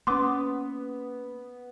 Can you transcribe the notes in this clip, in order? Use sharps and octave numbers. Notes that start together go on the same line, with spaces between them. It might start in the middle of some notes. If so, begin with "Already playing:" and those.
A#3 B3 C#4 C6 D6